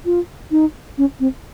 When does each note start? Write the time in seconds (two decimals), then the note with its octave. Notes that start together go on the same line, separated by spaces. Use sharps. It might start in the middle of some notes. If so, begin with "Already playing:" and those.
0.05 F4
0.51 D#4
0.98 C#4
1.20 C4